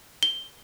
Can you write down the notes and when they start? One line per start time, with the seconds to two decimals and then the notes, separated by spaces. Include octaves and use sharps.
0.23 G7